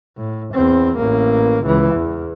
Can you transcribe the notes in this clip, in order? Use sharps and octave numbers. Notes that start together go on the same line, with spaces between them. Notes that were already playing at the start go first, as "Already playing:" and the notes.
A2
E2 C4
A1 A#3
C#2 E3
E2